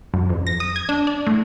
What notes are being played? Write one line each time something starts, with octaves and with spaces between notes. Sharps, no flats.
F#2
F2
A#6
D#6
G#6
D4
D5
A2